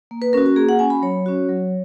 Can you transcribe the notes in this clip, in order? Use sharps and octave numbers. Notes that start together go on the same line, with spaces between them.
A#3
B4
C#4 F#4 A#4
F#4
A#3 G#4
F#5
C#4 F#4 G#5
B5
F#3 C#5
C#4 F#4
F#3